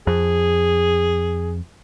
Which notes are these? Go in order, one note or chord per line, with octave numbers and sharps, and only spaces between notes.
F2 G#4